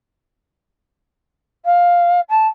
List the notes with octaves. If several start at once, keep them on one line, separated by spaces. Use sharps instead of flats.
F5
A5